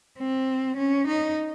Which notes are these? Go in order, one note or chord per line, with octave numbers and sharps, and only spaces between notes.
C4
C#4
D#4